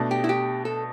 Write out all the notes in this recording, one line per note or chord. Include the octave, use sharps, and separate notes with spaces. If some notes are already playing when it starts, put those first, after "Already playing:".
Already playing: B2 A3 D4
G4
E4
G4
A4